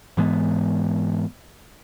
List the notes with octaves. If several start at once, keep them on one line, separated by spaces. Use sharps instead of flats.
G#2 E3 G#3 B3